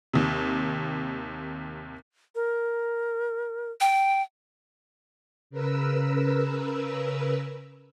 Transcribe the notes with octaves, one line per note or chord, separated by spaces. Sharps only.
D#2 C3
A#4
G5
C#3 A#4 B4 E6